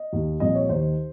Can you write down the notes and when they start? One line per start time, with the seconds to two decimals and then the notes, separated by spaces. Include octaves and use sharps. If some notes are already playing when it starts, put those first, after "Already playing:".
Already playing: D#5
0.13 D#2 D#3
0.40 C2 A#2 F3 D#5
0.55 C#5
0.69 D#2 D#3 C5